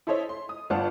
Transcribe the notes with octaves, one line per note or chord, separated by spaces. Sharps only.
E4 A4 C5 C#5 D#5 E5
C6
D#6
G1 F4 D5 F#5 A5 F6